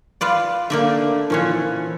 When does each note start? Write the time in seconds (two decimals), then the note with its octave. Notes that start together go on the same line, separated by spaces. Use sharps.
0.21 F4 B4 D5
0.70 D3 A3 A#3 D5 E5
1.30 A#2 E3 F3 C#4 C#5